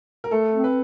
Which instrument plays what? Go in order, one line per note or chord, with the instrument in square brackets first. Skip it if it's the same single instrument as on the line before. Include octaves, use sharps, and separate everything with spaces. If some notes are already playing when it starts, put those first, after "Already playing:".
[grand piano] A#4
[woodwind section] A3 [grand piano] A4
[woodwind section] C4
[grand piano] B4